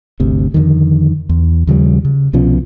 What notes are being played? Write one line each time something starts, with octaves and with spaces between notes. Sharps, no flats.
G1 D2 C3
F2 B2 D3 D#3
E2
D#2 C#3 F3 G3
C#3
C2 B2 F3 C#4